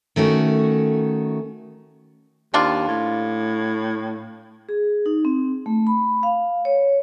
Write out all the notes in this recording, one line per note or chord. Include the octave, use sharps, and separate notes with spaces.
D#3 A3 C#4 F#4
D#2 C4 D4 F4
A2
G#4
D#4
C4
A3
B5
F5
C#5